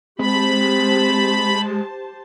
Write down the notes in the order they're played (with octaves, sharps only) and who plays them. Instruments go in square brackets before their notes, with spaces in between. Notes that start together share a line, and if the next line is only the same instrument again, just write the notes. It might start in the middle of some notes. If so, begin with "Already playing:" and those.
[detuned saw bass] G#3 [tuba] C4 [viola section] G4 C5 A5 [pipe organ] B5